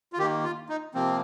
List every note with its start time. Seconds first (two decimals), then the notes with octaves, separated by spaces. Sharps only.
0.13 F4
0.18 D#3 G4
0.23 A#3
0.44 F4
0.69 D#4
0.94 C3 F3 A#3 C4